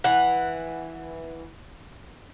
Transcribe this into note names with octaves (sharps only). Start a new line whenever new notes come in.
E3 F#5